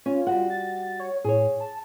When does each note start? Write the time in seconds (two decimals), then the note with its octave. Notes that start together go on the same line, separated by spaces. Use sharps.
0.06 C#4 F4
0.27 G3 F#4 F#5
0.50 A6
1.00 C#5
1.24 A2 G#4 C#5
1.60 A5